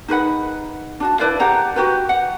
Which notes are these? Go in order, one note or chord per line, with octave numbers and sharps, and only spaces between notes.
D#4 G#4 B4 F#5
D4 F#4 A5
E4 B4 D5 F5
G4 G#4 F#5 A#5
F#4 G4 B4
F#5